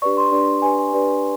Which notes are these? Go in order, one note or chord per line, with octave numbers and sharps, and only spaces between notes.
D4 G4 B4 D5 C#6
C6
D4 G4 B4 D5
D4 G4 B4 D5 G#5
D4 G4 B4 D5